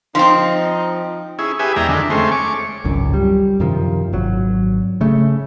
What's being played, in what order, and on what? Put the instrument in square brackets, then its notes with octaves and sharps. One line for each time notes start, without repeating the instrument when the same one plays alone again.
[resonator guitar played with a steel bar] F3 C4 [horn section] D#4
[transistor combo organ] C#4 E4 G#4
G4 G#4 B4 E5 G#5
E2 G#3 D5 E5 G5 A#5
F2 D3 D#3 D4
G#3 A3 C4 C#4
C#5 D6
[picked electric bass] G#1 C#2 F#2
G3
F#2 C3 D#3 F3
G#1 F#3
C#3 A3